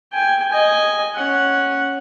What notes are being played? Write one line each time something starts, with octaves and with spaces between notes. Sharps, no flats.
G5 G#5
D#5 G#5
C#4 F#5